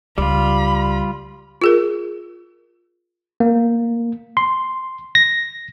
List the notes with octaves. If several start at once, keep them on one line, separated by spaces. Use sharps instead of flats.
C#2 G3 F4 B5
F4 G#4 A#4
A#3
C6
A#6